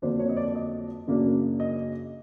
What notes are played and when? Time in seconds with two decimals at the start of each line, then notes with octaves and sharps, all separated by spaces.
0.02 F2 D3 F#3 A#3 D4 C5
0.19 C#5
0.29 D#5
0.37 D5
0.55 D#5
1.07 F#2 C#3 F#3 A#3 D4
1.60 D#5